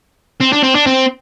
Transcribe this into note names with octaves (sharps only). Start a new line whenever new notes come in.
C4
D4
C4
D4
C4